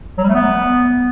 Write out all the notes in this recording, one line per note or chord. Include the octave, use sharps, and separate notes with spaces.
F#3
G3
A3
B3